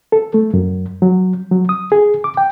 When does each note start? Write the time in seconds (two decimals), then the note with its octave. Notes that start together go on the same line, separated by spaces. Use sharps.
0.12 A4
0.34 A3
0.54 F#2
1.02 F#3
1.51 F#3
1.69 D#6
1.92 G#4
2.24 D6
2.37 G5